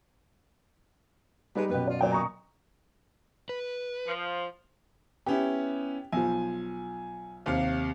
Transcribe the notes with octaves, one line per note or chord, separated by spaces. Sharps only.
G3 G#3 D#4 B4
F#2 B2 G4 B4
F4 D5
A#2 F#3 D5 G5
A#5 C#6 D#6
B4
F3
B3 C#4 E4 G4
B1 F3 G#5
D#2 C3 F5